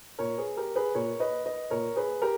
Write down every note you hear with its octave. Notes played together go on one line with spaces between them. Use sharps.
A#2 A#4 C#5
G#4 B4
G4 A#4
G#4 B4
A#2 A#4 C#5
B4 D#5
B4 D#5
A#2 A#4 C#5
G#4 B4
G4 A#4